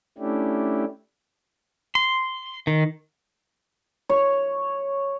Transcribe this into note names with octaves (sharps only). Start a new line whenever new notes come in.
A3 C#4 D4 E4 G4
C6
D#3
C#5